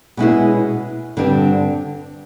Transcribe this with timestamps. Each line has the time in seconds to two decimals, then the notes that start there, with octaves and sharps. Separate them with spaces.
0.17 B2 G#3 C#4 E4 G#4
1.17 G2 D3 G3 C4